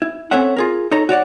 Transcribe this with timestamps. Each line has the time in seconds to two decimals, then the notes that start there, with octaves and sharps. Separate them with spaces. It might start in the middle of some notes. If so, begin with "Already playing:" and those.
0.02 E4
0.31 C4 C#4 A4 C#5 E5 F#5
0.57 F4 G#4 A#4
0.91 D#4 A4 C#5 A#5
1.09 F#4 C#5 D5 F#5